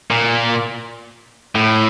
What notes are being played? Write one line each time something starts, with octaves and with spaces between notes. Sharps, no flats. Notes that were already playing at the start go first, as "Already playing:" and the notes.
A#2
A2